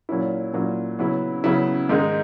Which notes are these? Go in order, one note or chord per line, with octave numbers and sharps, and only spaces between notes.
A#2 F#3 C#4 E4
A#2 F#3 C#4 E4
C#3 F#3 B3 E4
C#3 F#3 B3 E4
G#2 D#3 G#3 D#4